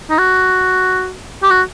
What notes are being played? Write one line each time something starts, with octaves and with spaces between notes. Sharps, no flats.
D#4
F#4
G4
F#4